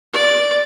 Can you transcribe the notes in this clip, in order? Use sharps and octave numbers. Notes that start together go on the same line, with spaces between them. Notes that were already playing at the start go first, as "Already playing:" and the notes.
D5